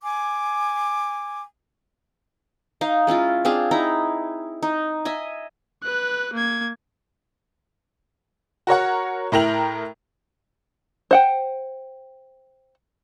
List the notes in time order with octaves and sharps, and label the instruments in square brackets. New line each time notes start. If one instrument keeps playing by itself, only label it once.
[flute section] G#5 D6
[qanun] D#4 F5
G#3 C#4 E4 F4
C4 D4 G#4 F5
D#4 E4 A#5
D#4
D#5 E5 G#5
[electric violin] B4 F#6
A#3 G#6
[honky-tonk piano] F#4 A#4 C#5 F#5
A2 E4 A#4 G5 F7 F#7
[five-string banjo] C5 F#5 G5